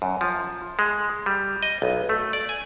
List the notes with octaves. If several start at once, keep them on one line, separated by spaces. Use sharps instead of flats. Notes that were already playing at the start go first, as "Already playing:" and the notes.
F#2
F3
G#3
G3
D#5
B1
A3
D5
G#5